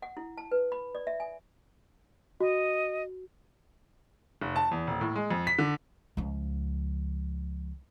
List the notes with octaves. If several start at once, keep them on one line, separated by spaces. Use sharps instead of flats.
F#5
E4
A5
B4
B5
D5
E5
G#5
F#4 D#5
F1
A5
E2
D#1
A2
G#3
F2
B6
D3
C#2 F3